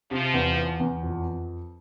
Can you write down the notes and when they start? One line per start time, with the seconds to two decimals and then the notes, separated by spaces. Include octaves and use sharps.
0.11 C3 F3
0.34 E2
0.57 E2
0.80 E2
1.03 F2